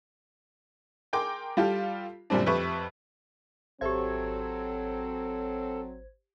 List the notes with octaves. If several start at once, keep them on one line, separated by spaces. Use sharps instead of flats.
G#4 A#4 G5 C6 D6
G3 F4 G4 A4 F5
F#2 A#2 D3 G3 C4 D4
F2 G4 B4 E5 C#6
G#1 F#3 C4 G4 A4 C5 E5 G#6